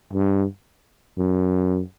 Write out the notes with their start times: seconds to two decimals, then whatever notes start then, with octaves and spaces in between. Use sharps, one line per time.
0.13 G2
1.18 F#2